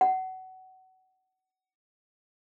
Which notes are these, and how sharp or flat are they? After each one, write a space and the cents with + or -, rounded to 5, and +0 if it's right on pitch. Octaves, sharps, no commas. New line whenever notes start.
F#5 +25